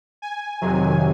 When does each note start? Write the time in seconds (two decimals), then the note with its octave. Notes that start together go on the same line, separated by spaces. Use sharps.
0.22 G#5
0.61 F2 C3 D#3 F#3